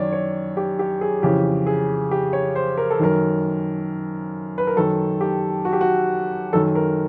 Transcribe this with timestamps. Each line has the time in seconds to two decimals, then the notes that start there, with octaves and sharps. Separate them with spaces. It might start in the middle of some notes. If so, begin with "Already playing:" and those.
Already playing: F#2 D#3 C#5 D5
0.13 C#5
0.57 G4
0.79 G4
1.01 G#4
1.22 F2 C#3 E3 G4
1.66 G#4
2.11 G4
2.33 C#5
2.56 C5
2.78 A#4
2.91 A4
3.00 F#2 D#3 A#4
4.58 B4
4.67 A#4
4.76 F#2 D#3 A4
5.21 G4
5.65 F#4
5.73 G4
5.81 F#4
6.53 F#2 D#3 A4
6.75 A#4